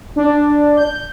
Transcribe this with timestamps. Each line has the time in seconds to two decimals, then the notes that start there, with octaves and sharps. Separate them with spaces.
0.16 D4
0.77 G6